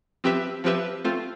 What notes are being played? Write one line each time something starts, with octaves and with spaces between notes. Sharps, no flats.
F3 C4 G4 B4 E5
F3 C4 G4 B4 E5
A3 C4 F4